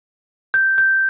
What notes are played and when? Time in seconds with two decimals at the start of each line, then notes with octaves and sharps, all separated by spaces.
0.54 G6
0.78 G6